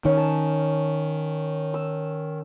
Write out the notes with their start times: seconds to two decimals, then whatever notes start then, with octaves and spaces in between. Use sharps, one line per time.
0.05 D#3 C#4
0.17 A5
1.74 E6